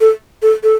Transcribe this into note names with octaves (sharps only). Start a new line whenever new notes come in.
A4
A4
A4